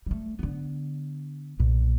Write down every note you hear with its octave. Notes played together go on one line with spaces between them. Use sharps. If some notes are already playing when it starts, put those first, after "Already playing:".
G3 A3
D3 B3
B1 A#2